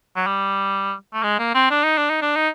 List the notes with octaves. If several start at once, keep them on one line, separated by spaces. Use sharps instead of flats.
F#3
G3
A3
G#3
A#3
C4
D4
D#4
D4
D#4
D4
D#4